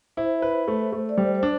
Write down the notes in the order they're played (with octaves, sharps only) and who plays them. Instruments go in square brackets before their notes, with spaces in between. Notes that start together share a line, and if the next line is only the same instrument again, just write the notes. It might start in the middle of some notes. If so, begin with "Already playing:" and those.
[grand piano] E4 [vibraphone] C5
[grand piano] B4
A3
A3
[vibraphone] D5
[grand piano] G3 [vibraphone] C5
[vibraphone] C5
[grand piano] D4